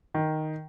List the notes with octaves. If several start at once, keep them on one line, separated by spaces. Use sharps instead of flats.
D#3